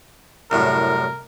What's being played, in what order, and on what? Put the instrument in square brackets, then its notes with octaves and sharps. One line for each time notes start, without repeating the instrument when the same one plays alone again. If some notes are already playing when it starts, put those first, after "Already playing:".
[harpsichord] C2 F#2 A2 [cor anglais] A#4